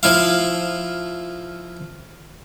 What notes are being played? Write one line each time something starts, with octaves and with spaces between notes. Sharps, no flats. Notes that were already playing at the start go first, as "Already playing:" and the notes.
F3 E4 F5